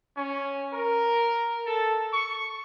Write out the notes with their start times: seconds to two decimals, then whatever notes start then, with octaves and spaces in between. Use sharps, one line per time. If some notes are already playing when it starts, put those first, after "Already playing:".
0.16 C#4
0.73 A#4
1.66 A4
2.12 C#6